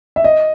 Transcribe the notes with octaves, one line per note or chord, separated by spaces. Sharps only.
E5
D#5